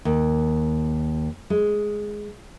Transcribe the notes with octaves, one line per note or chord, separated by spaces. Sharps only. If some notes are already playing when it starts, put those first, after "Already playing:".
D#2
G#3